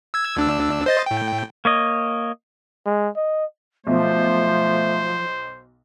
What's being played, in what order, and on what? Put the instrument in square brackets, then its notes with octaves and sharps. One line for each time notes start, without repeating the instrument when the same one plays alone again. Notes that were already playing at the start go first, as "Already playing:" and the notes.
[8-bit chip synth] E6 G#6
D2 D4 E6
C5 D#5 A6
A2 G5
[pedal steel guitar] A#3 C#5 D#5
[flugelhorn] G#3
D#5
[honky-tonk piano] B1 [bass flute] F3 [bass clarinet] A3 [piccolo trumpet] C5